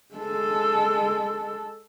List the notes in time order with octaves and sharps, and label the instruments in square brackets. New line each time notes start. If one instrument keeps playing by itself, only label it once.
[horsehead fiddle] G#3 A4